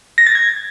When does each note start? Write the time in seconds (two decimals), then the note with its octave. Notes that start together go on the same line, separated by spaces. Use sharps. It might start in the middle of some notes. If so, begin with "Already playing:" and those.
0.18 A#6
0.26 A6
0.35 G#6